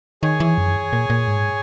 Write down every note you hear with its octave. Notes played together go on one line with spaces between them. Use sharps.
D#3 G#4 C#5 G#5
E3
F#2
A#2
A#2
G#2